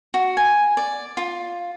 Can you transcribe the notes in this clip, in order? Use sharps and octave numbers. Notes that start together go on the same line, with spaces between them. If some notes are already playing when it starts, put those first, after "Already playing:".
F#4
G#5
D5
F4